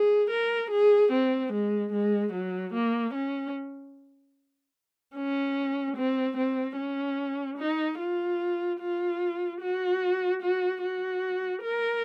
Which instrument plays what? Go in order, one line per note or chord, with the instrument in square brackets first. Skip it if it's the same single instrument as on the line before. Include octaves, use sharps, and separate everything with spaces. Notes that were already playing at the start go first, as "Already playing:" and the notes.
Already playing: [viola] G#4
A#4
G#4
C4
G#3
G#3
F#3
A#3
C#4
C#4
C4
C4
C#4
D#4
F4
F4
F#4
F#4
F#4
A#4